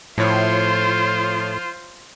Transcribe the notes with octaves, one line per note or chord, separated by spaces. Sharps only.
A2 F3 E4 F4 C5 C#5